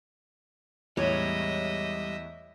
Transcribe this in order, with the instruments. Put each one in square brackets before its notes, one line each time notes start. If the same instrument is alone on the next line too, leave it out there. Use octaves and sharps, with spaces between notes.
[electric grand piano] E2 A2 [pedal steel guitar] G3 G#3 [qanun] C#5 [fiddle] D#5 E5